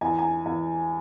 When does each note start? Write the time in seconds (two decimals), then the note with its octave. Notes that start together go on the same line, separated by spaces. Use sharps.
0.01 E2 G#5
0.19 G#5
0.45 E2